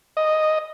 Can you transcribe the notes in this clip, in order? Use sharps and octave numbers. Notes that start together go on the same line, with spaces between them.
D#5